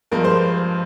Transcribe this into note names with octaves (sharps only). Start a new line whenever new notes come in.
G2 F3 G#3 A#4
C5